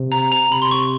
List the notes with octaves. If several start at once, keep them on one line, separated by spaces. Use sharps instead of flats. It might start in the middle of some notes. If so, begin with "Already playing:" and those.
Already playing: C3
A#5
A#5
C3 B5
C6
C#6